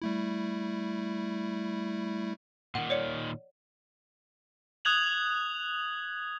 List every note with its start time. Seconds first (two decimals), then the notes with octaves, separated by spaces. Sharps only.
0.02 G3 A3 E4
2.75 A#2 D#3 F#5
2.90 C#5 D5 C#7
4.85 D#6 F#6 G#6 F7 F#7